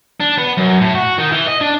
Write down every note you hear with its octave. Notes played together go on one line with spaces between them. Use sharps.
D4
B3
F#2
A2
F#4
D#3
E3
D#5
D4